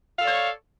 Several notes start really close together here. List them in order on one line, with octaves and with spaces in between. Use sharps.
F5 A4 D5 C#5